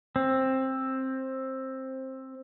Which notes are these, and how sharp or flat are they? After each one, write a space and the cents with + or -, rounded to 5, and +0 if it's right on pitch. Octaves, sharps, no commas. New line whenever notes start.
C4 +15